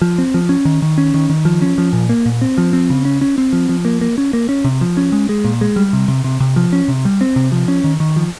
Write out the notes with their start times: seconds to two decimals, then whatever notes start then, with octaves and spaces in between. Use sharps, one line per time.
0.02 F3
0.18 C4
0.34 F3
0.49 C#4
0.65 D#3
0.82 D#3
0.98 C#4
1.14 D#3
1.30 D#3
1.45 F3
1.62 C#4
1.78 F3
1.93 A#2
2.09 A#3
2.26 A#2
2.41 C4
2.58 F3
2.73 C4
2.90 C#3
3.05 C#4
3.21 C#4
3.38 C4
3.53 F3
3.69 F3
3.85 A#3
4.01 A#3
4.18 C#4
4.33 A#3
4.49 C#4
4.64 C3
4.81 F3
4.97 C#4
5.12 G#3
5.29 G#3
5.45 A#2
5.61 G#3
5.76 G3
5.93 C3
6.08 C3
6.24 C3
6.40 C3
6.56 F3
6.73 C#4
6.88 C3
7.05 G3
7.21 C4
7.36 C3
7.52 F3
7.68 C#4
7.84 D#3
8.00 D#3
8.16 F3